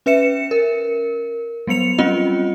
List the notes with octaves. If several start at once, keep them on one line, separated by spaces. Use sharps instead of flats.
C#4 B4 E5 C#7 E7
A#4
F#3 G3 B3 C#7 F7
G3 C4 C#4 F4 D#5